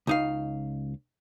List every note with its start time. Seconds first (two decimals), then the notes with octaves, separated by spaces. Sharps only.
0.07 C#2 D#4 F5